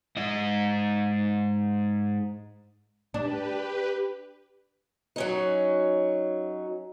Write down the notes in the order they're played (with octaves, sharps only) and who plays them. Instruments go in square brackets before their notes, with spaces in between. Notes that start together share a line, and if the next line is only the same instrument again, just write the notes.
[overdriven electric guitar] G#2 D#5
[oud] D4 [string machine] G4 B4
[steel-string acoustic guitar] F#3 C#4 D#4